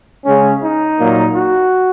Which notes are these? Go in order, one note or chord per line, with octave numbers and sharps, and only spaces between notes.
C#3 G#3 C#4
D#4
A#2 F#3 A#3
F#4